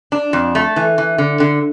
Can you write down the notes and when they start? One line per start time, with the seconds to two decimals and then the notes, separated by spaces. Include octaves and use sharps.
0.12 D4
0.33 F2
0.55 A3
0.76 E3
0.98 E3
1.18 D3
1.40 D3